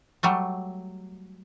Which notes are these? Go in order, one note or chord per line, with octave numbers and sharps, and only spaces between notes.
F#3 G3 A3